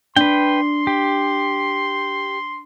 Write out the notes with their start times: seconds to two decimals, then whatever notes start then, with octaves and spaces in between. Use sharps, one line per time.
0.16 D4 B4 G5 C6
0.87 G4